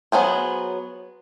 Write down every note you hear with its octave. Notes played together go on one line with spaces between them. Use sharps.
F#3 B3 G#4 C5